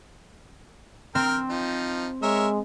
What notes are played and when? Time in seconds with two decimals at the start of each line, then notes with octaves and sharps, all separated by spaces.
1.15 C4 A#4 G5 F6
1.50 F3 D#4
2.23 G#3 A#4 C#5 E5